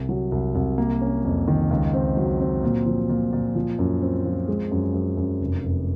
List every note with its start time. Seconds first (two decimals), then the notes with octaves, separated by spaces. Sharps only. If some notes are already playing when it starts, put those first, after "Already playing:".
Already playing: C2
0.09 F#3
0.32 C2
0.55 C2
0.78 A#3
1.01 C#4
1.24 F2
1.48 D#3
1.70 C#2
1.94 C4
2.17 F#3
2.40 C4
2.63 A#2
2.86 F3
3.09 A#2
3.33 A#2
3.55 F3
3.79 F#2
4.02 C4
4.25 F3
4.48 G#3
4.71 F#2
4.94 F#2
5.17 F#2
5.41 F1
5.64 F1